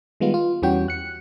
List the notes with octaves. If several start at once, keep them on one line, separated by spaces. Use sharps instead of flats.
D#3 G3 G#3 B3 F4
F4
E2 E3 G3 C#4 F#4 G5
F#6 C#7